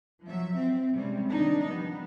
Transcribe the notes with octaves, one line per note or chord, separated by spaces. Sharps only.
F3 F#3 E5
C4
C3 G3 G#3 C4 C#4
D#3 D4 D#4
F3 G3 B3